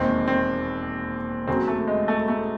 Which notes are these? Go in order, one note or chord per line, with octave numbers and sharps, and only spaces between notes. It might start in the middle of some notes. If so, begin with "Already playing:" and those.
Already playing: E1 D#2 D#3 C4
C4
D#2 C#3 F#3 C4
A3
G#3
A3
A3